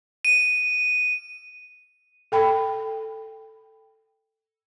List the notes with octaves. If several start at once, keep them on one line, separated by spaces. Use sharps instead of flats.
D#7
A4 G5 B5